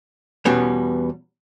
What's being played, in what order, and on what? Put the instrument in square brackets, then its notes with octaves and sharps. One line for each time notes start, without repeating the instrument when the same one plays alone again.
[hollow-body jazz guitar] E2 B2 G3 B3 C#4